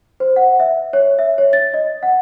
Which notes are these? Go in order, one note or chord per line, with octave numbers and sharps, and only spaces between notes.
C5
F#5
E5
C#5
E5
C#5
A6
D#5
F#5